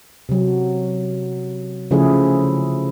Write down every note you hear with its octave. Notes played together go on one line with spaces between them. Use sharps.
C3 F#3
C#3 F3 A3 E4 G#4